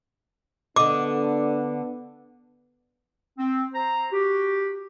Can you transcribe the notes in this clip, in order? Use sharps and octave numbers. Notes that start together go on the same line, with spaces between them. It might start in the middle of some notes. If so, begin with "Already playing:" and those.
D3 B3 D4 D#5 D6
C4
C5 A#5
F#4 G4